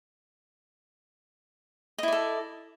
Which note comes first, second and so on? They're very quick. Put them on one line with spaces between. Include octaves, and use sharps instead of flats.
D#5 E4 D5 A4